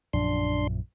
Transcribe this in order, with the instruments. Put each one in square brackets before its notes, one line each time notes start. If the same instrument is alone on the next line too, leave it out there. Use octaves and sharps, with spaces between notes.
[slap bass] A#1 F#2 F3 [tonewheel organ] D4 C6